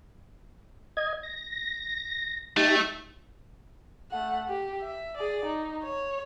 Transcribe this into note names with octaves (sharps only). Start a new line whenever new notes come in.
D#5 G#6
A#6
A3 D#4 G4
A3 F#5
G4
E5
G#4 D5
D#4
C#5